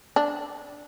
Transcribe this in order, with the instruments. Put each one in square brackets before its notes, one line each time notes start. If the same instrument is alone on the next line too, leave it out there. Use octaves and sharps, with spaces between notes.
[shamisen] D4